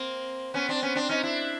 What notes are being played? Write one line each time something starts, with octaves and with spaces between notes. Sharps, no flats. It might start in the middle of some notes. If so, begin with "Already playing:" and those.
Already playing: A#3 C4
B3 C#4
C4 D4
B3 C#4
C4 D4
C#4 D#4
D4 E4